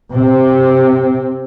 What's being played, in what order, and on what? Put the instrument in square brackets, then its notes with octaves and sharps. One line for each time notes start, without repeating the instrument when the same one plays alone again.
[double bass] C3 C4